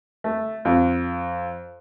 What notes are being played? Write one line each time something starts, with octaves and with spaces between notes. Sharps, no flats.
A3
F2